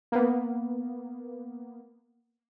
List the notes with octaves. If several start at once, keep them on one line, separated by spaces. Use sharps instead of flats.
A#3 B3